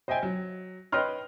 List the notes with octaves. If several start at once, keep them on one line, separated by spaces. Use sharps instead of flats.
C5 D#5 E5 G5 G#5
F#3
B4 C#5 D#5 G5 C6 F6